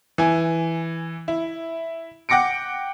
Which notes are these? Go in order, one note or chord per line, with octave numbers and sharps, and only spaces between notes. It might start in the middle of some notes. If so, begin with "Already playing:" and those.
E3 G#5
E4
F#5 G5 D6 A#6 C#7 D7